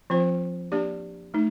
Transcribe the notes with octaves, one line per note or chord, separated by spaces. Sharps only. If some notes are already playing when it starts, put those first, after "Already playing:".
F3 C4 F4 C5
A#3 D4 G4 D5
A3 D#4